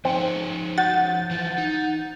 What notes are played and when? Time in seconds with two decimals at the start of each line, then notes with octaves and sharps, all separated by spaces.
0.05 F3 C4 D#4 C#5
0.78 F#4 F#5 G6 A6
1.31 E3 F4
1.58 D#4